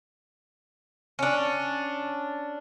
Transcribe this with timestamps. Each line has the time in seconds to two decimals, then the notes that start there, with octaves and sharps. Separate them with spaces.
1.19 C#4 D4